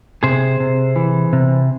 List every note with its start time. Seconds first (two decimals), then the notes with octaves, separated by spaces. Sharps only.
0.23 C3 G#4 C5
0.60 C3
0.96 E3
1.33 C3